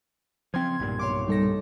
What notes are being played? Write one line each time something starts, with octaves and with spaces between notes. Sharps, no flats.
C#3 F3 C4 C6 G#6
B1 G2 A#2
C#5 C6 D6
G3 D#4 A4 A#6